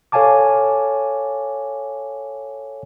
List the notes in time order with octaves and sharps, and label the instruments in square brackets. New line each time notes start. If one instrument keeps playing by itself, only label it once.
[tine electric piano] A4 C#5 F5 G#5 A5 D6